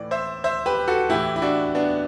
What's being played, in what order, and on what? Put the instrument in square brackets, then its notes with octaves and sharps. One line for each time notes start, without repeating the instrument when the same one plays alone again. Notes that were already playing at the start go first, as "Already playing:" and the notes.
Already playing: [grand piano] A2 E3 D5
C5 E5
C5 E5
G4 B4
F#4 A4
A2 E3 E4 G4
E4
D4 F#4
B3 D4